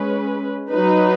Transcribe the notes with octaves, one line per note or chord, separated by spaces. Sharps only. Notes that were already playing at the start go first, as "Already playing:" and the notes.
Already playing: G#3 C#4 B4
F#3 D#4 B4